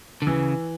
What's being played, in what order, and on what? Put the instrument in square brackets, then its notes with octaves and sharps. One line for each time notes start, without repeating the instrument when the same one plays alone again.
[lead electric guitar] D3
[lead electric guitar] C#3 [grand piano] E3